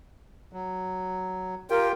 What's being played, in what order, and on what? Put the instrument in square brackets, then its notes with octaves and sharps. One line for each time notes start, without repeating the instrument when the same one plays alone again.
[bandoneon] F#3
[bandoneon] F4 G4 G5 [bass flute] A#4